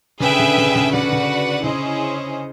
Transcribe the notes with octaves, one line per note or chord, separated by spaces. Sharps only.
C#3 G#4 B4 E5 G5
D3
C#3
D3
C#3
D3
C#3
D3
C#3 F#4 B4 D5 F#5
D3
C#3
C#3 C#4 E4 G#4 C5 D#5